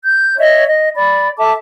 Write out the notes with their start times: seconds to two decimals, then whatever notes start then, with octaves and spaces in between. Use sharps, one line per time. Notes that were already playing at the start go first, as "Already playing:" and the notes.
0.05 G6
0.38 C#5 D#5 E5
0.66 D#5
0.95 D5 B5
1.37 A4 E5 A5 D6